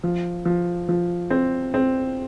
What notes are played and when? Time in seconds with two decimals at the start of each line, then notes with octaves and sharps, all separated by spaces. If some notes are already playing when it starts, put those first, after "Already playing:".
0.03 F3
0.45 F3
0.89 F3
1.30 C4
1.74 C4